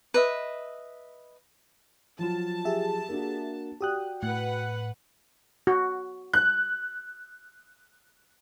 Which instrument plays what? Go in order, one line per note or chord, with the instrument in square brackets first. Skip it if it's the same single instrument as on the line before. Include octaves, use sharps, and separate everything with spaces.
[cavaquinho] B4 D#5 E5
[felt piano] F3 F#3 F4 [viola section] A5
[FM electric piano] G4 G#4 E5
[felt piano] A#3 D4 F#4
[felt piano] F#4 D5 G5 [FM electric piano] G4 D#6 F#6
[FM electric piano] A2 [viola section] B4 F#5
[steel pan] F#4
[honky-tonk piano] F#6